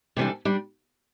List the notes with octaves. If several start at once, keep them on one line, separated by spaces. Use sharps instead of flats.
C3 E3 G3 D4 A4
G3 D4